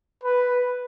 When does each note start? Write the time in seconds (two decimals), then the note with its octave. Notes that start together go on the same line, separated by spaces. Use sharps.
0.24 B4